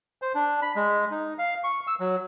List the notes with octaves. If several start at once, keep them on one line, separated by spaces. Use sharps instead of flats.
C5
D4
B5
G#3
D#4
F5
C#6
E6
F#3